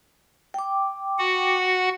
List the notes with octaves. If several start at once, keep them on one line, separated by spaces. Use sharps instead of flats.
G5 D6
F#4 F#5